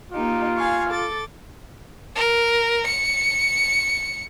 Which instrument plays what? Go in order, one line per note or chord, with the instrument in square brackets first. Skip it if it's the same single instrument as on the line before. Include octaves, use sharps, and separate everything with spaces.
[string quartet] A#3 D#4 G4 [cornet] F4
[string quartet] F5 G#5 C#6
A4 D6 A6
[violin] A#4
C#7